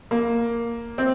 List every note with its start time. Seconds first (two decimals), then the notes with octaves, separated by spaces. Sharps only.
0.11 A#3
0.98 C4